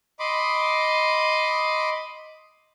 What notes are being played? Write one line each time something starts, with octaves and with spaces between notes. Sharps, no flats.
D#5 B5 C6 D6